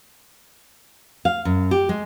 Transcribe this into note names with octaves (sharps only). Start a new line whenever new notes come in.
F5
F#2
G4
G#3